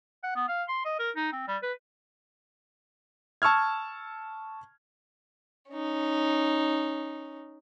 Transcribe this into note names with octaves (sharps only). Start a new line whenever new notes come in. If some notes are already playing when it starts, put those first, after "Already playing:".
F#5
B3
F5
C6
D#5
A#4
D#4
C4
G3
B4
A5 C#6 E6 F6 G#6
C#4 D#4